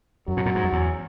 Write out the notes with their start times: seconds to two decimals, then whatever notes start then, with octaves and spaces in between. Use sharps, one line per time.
0.28 F#2 F#3
0.37 B2
0.46 A#2
0.55 G#2
0.64 F#2
0.73 E2